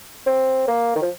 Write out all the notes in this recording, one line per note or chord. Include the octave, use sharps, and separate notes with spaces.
C4
A#3
D#3
F3